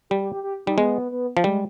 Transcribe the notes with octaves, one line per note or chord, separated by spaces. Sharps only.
G3 G4
G4
G4
G4
G3 D#4
G#3 B3
B3
F3
G3 G#3